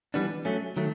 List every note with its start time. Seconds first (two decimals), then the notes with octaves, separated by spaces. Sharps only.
0.14 E3 G3 B3 D4
0.45 F#3 A3 C#4
0.77 D#3 F#3 A3